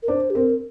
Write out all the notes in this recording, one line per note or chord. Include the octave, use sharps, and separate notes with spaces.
A#4
D4 C5
G4
C4 A#4